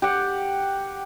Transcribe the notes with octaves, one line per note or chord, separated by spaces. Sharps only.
G4 F#5